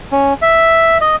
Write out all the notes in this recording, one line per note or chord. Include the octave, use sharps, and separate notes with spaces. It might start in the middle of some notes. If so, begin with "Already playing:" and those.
C#4
E5
D#5